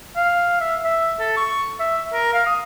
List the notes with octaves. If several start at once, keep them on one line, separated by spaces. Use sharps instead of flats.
F5
E5
E5
A4
C#6
E5
A#4
F5
D#6